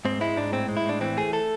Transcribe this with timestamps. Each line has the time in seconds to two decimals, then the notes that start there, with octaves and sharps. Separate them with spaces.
0.05 G#2 C4
0.21 G#3 E4
0.37 G#2 D4
0.52 A2 C4
0.69 G#3
0.77 E4
0.85 A2 D4
1.01 E3 C4
1.17 A3 G#4
1.33 A4